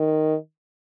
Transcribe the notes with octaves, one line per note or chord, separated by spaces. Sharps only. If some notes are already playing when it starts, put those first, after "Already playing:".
Already playing: D#3